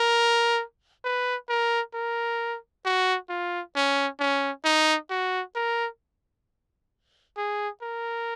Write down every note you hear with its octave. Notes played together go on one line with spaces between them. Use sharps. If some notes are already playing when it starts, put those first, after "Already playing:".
Already playing: A#4
B4
A#4
A#4
F#4
F4
C#4
C#4
D#4
F#4
A#4
G#4
A#4